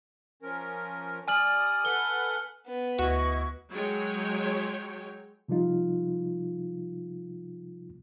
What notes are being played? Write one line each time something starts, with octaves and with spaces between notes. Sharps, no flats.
F3 C#4 A#4
G3 D5 G#5 D#6 F6 F#7
A4 B4 F#5 G7
B3
D2 E4 F#4 D#5 C#6
F#3 G#3 C#5 G5
C3 F3 G3 D#4 F4